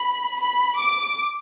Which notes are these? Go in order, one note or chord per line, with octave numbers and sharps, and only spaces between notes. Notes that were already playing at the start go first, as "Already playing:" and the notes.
Already playing: B5
B5
D6